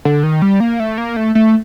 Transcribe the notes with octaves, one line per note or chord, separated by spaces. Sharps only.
D3
D#3
G3
A#3
A3
A#3
A3
A3